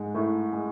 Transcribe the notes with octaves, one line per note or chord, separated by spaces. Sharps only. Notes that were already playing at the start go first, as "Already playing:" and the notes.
Already playing: G#2 G#3
A2 A3
G#3